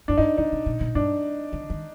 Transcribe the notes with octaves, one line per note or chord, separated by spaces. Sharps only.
G2 D4
G#2 D#4
C3 D#4
C3
B2
B2
G2 D4
D3
D#3